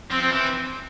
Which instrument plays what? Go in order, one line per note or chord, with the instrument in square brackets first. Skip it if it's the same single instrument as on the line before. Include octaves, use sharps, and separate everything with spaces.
[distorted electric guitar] F3 [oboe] C4
[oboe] C4
[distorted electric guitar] E3 [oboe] C4